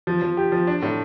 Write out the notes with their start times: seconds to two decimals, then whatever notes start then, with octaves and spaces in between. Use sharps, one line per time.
0.07 F3
0.22 F3
0.37 G4
0.52 F3
0.67 D4
0.82 A2